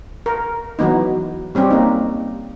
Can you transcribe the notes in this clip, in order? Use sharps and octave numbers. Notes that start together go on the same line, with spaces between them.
A#4
E3 F#3 B3 D#4
G3 C4 C#4 G4
A#3 D#4